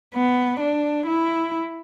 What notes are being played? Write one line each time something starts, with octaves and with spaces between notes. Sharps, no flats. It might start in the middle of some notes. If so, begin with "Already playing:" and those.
B3
D4
E4